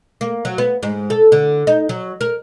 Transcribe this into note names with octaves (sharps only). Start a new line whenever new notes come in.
A#3
F#3
B3
G#2
A4
D3
D#4
F#3
A#4